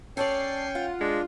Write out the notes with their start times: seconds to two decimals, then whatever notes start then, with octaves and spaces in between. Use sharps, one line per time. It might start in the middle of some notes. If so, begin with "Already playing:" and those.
0.17 C#4 A4 C#5 D5 G5 C7
0.75 F4 F#5
1.01 G#3 D4